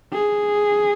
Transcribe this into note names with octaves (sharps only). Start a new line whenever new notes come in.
G#4